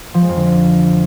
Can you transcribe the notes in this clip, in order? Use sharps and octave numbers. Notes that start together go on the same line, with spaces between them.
F3
G#3
F2
D3